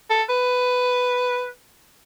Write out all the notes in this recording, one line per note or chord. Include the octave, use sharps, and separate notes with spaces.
A4
B4